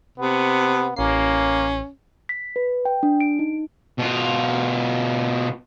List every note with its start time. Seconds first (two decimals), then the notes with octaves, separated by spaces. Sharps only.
0.18 C3 B3
0.96 A1 A#3 C#4 C7
2.29 B6
2.56 B4
2.85 G5
3.03 D4
3.20 D7
3.39 D#4
3.99 B2 F4